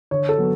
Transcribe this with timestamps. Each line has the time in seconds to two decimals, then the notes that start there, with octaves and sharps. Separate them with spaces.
0.11 D3 C#5
0.29 A4
0.38 F#3 B3